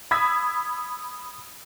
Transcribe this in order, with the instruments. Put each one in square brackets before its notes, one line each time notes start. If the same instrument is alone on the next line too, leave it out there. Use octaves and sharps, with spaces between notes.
[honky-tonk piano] B5 D#6 E6 G#6 B6